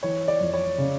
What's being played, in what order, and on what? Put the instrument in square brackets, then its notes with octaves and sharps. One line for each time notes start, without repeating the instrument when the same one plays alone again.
[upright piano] E3 [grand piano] C#5
[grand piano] D5
[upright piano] F2
[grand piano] C#5
[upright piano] C#3